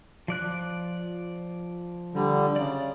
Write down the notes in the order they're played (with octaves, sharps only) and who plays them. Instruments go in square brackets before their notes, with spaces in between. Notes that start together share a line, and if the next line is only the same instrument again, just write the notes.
[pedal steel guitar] F3 D5 F#6
[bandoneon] D3 G3
[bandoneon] C#3 [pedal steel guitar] D5